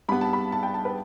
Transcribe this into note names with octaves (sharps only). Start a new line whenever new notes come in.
G2 G3 B3 B5
A5
B5
A5
G5
A5
B4